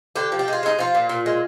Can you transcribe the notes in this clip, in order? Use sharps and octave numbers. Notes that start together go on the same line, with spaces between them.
D3 G4
F3
G4
G#3 F4
G#3 D#4
F3 F4
A#2
A#2
G#3